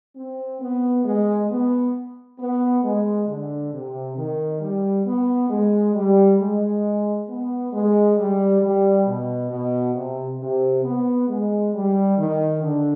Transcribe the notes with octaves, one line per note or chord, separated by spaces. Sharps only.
C4
B3
G#3
B3
B3
G#3
D3
C3
D#3
G3
B3
G#3
G3
G#3
B3
G#3
G3
G3
B2
B2
C3
C3
B3
G#3
G3
D#3
D3